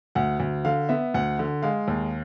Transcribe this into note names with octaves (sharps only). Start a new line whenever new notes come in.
D2 F#5
D2
D3 F5
B3 E5
D2 F#5
D3
G#3 F5
D#2